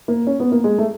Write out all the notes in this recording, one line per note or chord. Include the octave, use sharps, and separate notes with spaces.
A#3
C#4
B3
A#3
G#3
A3